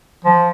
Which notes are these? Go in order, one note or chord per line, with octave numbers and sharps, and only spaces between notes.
F3